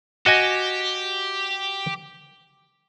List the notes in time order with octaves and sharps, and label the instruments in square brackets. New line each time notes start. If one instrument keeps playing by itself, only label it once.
[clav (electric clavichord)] F#4 D#5 G#5 [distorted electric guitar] G4